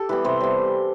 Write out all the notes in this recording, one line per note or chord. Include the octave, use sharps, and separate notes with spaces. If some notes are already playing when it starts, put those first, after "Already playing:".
Already playing: G4 A4
E3 G3 B3 B4
C3 C5
G3 B3